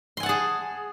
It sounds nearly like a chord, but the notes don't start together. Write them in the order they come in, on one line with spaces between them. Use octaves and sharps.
C6 G#5 F#5 A5 G#4